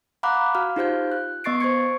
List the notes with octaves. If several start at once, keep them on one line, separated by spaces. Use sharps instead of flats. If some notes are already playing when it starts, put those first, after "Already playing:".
F5 F#5 A#5 B5 D6 F#6
F#4 F5 F6
D#4 F4 G4 C5 F5 G6
F#6
B3 D#5 C#6 A6 C7 D7
C5 C#6 G#6 C#7